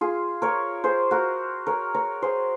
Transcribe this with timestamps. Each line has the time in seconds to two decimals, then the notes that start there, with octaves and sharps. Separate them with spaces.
0.01 F4 G#4
0.42 A#4 C#5
0.84 G#4 C5
1.11 F#4 A#4
1.67 A#4 C#5
1.94 A#4 C#5
2.22 G#4 C5